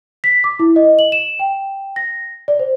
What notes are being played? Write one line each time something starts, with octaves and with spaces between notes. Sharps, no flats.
B6
D6
E4
D#5
F#7
E7
G5
A#6
D5
C5